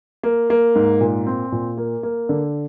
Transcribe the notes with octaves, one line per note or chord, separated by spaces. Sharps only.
A#3
A#3
G#2
A#2
C4
A#2
A#3
A#3
D3